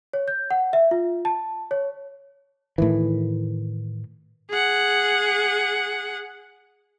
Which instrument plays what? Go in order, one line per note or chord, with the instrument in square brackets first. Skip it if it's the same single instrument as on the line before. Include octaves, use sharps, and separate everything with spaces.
[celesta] C#5
G6
F#5
E5
F4
A5
C#5
[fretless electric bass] A2 D#3 E3
[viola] G#4 F#5